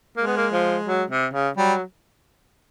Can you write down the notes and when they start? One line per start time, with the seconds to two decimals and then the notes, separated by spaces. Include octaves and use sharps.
0.17 G#3 A#3
0.27 B3
0.37 A#3
0.52 F3
0.87 F#3
1.10 C3
1.33 C#3
1.57 F#3 G3